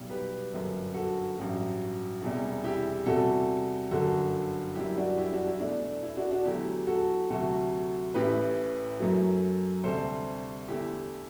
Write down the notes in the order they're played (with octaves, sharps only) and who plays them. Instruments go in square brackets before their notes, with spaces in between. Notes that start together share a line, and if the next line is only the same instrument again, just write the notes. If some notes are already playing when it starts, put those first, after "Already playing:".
Already playing: [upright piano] B1 B2 G3
G4 B4
G1 F#2 D3
F#4 A4
A1 G2 F#3
E1 E2 C3 G3
E4 G4
E2 C3 G3 F#4 A4
G1 F#2 D3 F#4 A4
F#2 E3 G3 E4 G4
D4 F#4
E4 G4
D4 F#4
E4
E2 B2 A3 D4
E4
D4 F#4
D4 F#4
E2 D3 F#3 A3 E4 G4
F#4 A4
D2 C3 F#3 A3 F#4 A4
A1 A2 E3 A3 G4 B4
F#2 F#3 A3
D2 C3 G3 A4 C5
E2 D3 A3 E4 G4